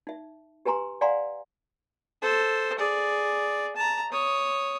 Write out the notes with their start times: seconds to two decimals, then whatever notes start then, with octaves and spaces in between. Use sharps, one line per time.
0.07 D#4 E5
0.65 G4 B4 G#5 A#5 C6
1.01 D5 F5 F#5 G#5 A#5 C6
2.22 A4 C5
2.79 G#4 D5
3.76 A5 A#5
4.12 C#5 D#6